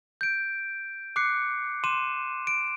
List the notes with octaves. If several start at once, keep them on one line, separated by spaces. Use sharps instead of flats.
G6 D7
D6 F#6 C7 C#7
C6 D6 D#7 E7
D7